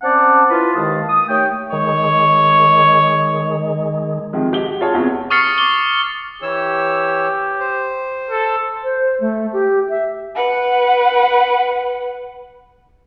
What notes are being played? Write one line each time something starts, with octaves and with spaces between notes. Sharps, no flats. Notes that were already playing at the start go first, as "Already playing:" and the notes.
C4 C#4 C5 D5 F#5 A5
E4 F4 B4
D#2 D#3 G#3 F5 A5 D#6
D#6
D#2 A3 C#5 G5
D#3 G#3 C#5
C3 D#3 F3 G#3
G#3 G4 G7
F#4
F4 G#4 C#5 A5
E2 C3 E4 G#4
C#6 D#6 F6 A6 C7 C#7
D6 G7
E3 G4 C#5 E6
C5
A4
C5
A3
G4
E5
B4 F#5